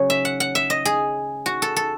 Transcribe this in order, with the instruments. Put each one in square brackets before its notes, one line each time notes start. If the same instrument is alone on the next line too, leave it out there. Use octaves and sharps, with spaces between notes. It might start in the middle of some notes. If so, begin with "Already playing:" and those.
Already playing: [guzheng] C#3 F#3 C#4 C#5
E5
F#5
F#5
E5
D#5
G#4
F#4
A4
A4